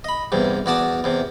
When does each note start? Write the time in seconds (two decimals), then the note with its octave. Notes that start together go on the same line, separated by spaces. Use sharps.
0.04 D#5 B5
0.32 E2 G2 C3
0.66 E2 F#4 D5 A5 D#6
1.04 E2 C3